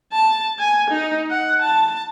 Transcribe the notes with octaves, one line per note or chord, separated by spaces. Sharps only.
A5
G#5
D#4
F#5
A5